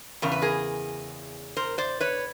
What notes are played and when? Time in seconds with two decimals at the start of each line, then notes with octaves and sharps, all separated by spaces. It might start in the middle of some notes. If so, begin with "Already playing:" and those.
0.22 E2 C#3 A#4
0.32 B4
0.42 G#4 A#4
1.57 A#4 C5
1.78 C5 D5
2.00 B4 C#5